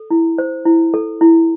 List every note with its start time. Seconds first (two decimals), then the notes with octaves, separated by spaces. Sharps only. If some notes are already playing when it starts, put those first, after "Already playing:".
Already playing: A4
0.10 E4
0.38 C5
0.65 E4
0.94 A4
1.21 E4